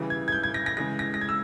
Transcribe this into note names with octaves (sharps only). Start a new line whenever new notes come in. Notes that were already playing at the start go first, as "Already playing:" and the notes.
Already playing: C#3 E3 G3
G#6
G#6
G6
G#6
A#6
A#6
C#3 E3 G#3 A#6
A#6
A#6
G#6
E6